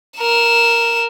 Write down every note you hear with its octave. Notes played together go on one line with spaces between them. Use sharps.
A#4 E7